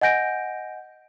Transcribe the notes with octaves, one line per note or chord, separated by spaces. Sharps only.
D#5 F#5 G#5 G6 A#6 D7